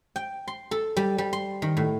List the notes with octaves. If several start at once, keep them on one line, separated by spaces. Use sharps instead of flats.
G5
C6
A4
G3
G3
C6
D#3
A2